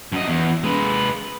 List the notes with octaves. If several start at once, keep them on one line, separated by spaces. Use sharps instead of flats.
F#2 D#5
E2
G#3 B4